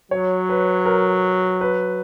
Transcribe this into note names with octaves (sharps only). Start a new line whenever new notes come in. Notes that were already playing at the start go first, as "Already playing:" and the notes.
F#3 C#5
B4
A#4
B4